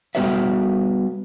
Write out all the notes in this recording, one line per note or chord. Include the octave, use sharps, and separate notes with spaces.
G3 B3 F#4 B4 C#5 E5